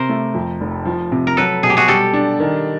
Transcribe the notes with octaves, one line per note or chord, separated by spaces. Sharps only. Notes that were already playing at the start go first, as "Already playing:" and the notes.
Already playing: C3 A#4 C5
A3
F2
F1
F3
C3
A#4
F#3 A4 B4
B2 G#4
G4
F#4 G#4
G3 G4 A4
D4
D#3